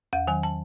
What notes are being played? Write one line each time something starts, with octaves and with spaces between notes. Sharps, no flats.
E2 F#5
D#3 F#3 G#5
A5